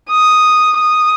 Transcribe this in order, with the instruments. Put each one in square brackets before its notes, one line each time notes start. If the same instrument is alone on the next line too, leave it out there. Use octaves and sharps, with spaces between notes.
[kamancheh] D#6
D#6